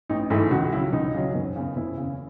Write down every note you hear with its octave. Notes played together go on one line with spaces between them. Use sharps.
A1 D#4
G#2 E3 A3 E4
C#2 F#4
C#3 F#3 E4
C#2 D#4
C#3 F#3
F#1
E2 C#3
F#1 E4
E2 C#3